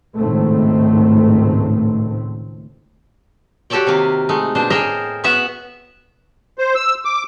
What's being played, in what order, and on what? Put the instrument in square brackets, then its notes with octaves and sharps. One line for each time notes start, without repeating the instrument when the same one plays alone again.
[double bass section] G#1 C#2 A2 D#3 A3 C4
[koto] F#4 G4 A4 C#5 D5 G5
C3 D#3 A#3
G#3 A3 D#4
B2 D4 C5
A2 G#4 A#4 D#5 E5 G5
B3 F#4 E5 F#5
[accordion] C5
E6
D6